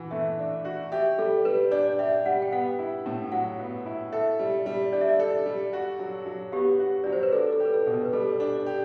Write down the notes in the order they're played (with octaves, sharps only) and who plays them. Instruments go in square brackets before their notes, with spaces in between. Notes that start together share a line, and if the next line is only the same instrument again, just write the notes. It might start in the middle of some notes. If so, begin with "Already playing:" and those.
Already playing: [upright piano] E3 F#4
[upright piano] A3 [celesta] E5
[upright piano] D4
F#4
[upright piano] G4 [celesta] E5
[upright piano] G3 [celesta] A4
[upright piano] G3 [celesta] B4
[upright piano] D4 [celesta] D5
[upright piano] G4 [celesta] E5
[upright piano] G3 [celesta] F#5
[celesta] G5
[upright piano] B3 [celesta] F#5
[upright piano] E4
A2
[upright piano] F#3 [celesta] F#5
[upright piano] B3
E4
[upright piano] A4 [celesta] E5
[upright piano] G3
G3
[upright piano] D4 [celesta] D5
[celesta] E5
D5
[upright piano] A4
G3
F#4
F#3
F#3
[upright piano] B3 [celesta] G4
[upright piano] F#4
[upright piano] F#3 [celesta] D5
[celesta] C5
B4
[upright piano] D4 [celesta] A4
[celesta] A4
[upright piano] G4
[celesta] B4
A4
[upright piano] B2
[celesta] B4
B4
[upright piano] G3 [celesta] A4
[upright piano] D4
G4